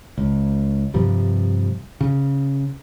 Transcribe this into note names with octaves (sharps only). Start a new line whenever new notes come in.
C#2
G2 C3 F3 G3
C#3